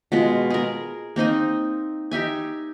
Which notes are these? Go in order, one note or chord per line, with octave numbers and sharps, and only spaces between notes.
B2 G#3 F4
G#4 A#4
A#3 C4 D#4 D#5
D#4 G4 E5 G#5